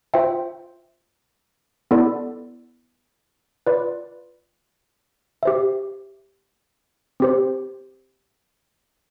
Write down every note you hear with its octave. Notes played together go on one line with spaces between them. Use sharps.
F4 C5 E5 G5
B3 E4 A4 D5
F4 B4 D5
G4 C5 E5
C4 G4 C5